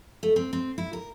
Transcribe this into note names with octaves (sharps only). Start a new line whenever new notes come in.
A3
C4
C4
E4
A#4